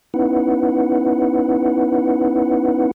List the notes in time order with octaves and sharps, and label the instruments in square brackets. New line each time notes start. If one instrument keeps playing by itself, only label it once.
[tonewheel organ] B3 C#4 D#4 E4 B4 F#5